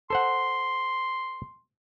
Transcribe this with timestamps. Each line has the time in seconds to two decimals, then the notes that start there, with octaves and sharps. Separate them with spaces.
0.10 A4 C5 F#5 C6